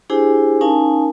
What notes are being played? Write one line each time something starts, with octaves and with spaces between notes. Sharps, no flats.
D4 E4 G4 G#4 C5 G#5
C#4 D#4 A#4 F5 G#5 A5